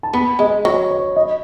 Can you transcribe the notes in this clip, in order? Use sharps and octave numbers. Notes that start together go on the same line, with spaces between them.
A5
B3 B5
G#3 D#5
F#3 C#5
C#5
D#5